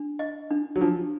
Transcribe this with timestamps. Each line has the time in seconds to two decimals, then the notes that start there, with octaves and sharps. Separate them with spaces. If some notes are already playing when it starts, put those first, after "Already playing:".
Already playing: D4
0.19 D#5
0.51 D4
0.76 F#3
0.81 F3 D4